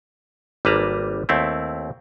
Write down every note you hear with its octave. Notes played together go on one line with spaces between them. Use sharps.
G#1 G3 A#3 B4 A5 A#5
D#2 A3 C4 E4